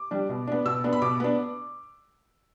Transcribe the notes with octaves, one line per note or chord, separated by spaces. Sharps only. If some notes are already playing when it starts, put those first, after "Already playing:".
Already playing: D6
G3 D4
B2
B3 D4
B2 E6
B3 D4
B5
B2 D6
B3 D4